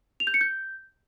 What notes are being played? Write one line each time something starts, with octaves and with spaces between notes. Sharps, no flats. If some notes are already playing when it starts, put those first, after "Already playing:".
F7
G6
C#7
G6